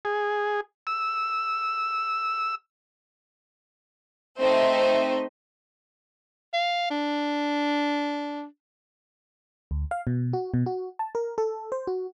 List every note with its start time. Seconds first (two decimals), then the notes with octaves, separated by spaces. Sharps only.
0.05 G#4
0.87 E6
4.41 A3 C4 D#4 C5 D#5 E5
6.53 F5
6.90 D4
9.71 D2
9.91 F5
10.07 B2
10.33 F#4
10.54 B2
10.66 F#4
10.99 A5
11.15 A#4
11.38 A4
11.72 C5
11.87 F#4